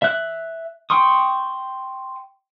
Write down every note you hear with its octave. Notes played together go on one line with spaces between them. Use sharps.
E5 F#6
G5 C6 C#6 D#6